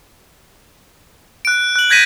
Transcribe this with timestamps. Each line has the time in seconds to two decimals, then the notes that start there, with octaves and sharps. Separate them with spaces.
1.45 F#6 D7
1.76 F#6 F#7
1.90 G6 G#6 A#6 B6 D#7